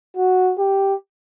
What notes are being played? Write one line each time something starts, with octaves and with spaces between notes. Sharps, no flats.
F#4
G4